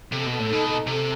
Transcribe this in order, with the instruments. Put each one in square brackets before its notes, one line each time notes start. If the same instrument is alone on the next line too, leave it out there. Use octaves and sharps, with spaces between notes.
[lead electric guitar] C3 [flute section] A4
[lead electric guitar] B2 [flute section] A4
[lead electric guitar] A2
[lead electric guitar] B2 [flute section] D#4
[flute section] A4
[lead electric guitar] C3 [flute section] A4